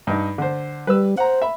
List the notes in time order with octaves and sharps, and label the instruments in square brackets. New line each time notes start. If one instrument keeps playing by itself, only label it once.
[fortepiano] G2 D#4
D3 C5
[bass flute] G3 [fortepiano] B4 E6
[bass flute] C5 [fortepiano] F#5 A#5
[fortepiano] E5 B5